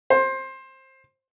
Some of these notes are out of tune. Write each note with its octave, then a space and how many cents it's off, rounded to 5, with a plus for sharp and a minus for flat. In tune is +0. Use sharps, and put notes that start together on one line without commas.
C5 +20